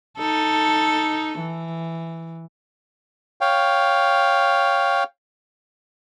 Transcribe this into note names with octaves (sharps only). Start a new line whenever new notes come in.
D#4 A4
E3
C#5 F5 G5